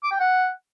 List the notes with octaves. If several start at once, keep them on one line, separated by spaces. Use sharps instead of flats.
D6
G5
F#5